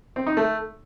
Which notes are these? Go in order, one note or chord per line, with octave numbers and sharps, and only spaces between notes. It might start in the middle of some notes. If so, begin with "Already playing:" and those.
C4
D#4
A3